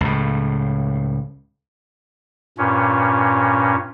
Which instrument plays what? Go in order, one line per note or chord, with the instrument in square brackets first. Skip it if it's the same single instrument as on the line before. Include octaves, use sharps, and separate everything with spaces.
[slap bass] C#2 A2
[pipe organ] G2 A#2 C#4